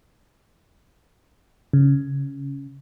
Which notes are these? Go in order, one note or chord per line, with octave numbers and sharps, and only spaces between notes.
C#3